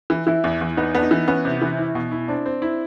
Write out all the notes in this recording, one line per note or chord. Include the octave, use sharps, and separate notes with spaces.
E3
E3 E4
E2
E2
B3 D#4
B3 D4
D#4
E3
B3 C#4
C3
E3
E4
B2
E4
C4 D4
C4
E4